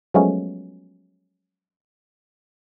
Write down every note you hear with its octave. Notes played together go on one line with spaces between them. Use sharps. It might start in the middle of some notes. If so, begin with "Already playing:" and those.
F3 F#3 G#3 A3 B3 C#4